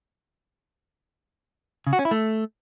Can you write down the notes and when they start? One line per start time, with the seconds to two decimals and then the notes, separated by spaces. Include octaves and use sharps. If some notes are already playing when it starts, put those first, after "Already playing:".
1.87 C#3
1.93 F#4
1.99 C#4
2.05 E4
2.11 A3